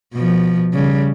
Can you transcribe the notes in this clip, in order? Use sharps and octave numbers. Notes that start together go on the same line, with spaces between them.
B2 F3
C#3 G3